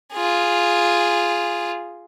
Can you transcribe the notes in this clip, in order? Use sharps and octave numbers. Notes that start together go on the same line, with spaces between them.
F4 G#4